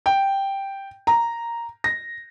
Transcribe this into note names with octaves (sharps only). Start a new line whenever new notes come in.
G5
A#5
A#6